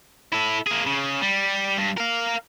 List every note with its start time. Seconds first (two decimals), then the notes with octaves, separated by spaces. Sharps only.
0.33 E4 A4
0.67 A#3 G#4
0.86 C#3
1.21 G3
1.77 G2
1.97 A#4 F5